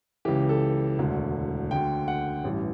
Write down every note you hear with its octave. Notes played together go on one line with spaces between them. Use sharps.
C#2 C#3 E3 G4
A4
E1 D2 D3
D2 D3 G5
F#5
A1 G2 E3